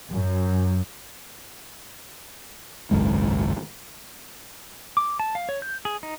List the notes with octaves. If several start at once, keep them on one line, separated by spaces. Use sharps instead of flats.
F#2
G#1 C#2 F#2 G#3
D6
A5
F5
C#5
G6
G#4
D#4